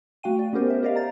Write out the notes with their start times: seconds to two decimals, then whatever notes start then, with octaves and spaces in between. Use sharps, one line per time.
0.23 A3 F#4 F5 G5 D#7
0.39 D5
0.53 B3 C#4 G4 A#4 C5
0.70 A#4 E5
0.83 G4 A#4 D5 D#5 F5
0.96 A#5 A6